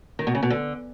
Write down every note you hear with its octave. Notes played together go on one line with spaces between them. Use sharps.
D#3
B2
C#3
B2
D3